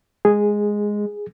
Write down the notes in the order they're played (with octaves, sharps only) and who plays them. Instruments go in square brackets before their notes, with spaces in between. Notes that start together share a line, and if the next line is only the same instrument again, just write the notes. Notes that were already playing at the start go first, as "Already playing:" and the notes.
[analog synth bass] G#3 [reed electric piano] G#4